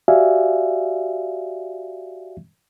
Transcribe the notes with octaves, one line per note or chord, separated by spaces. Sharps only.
F#4 G4 D5 E5 F5 G#5